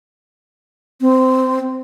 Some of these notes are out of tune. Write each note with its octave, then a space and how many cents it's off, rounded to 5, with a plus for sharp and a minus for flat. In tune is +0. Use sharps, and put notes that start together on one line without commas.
C4 -15